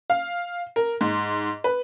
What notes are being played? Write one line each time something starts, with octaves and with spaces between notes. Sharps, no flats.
F5
A#4
G#2
B4